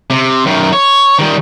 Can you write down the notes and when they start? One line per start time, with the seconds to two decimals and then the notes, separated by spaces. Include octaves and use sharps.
0.10 C3
0.47 F#2 D#3
0.73 C#5
1.19 D#3 G3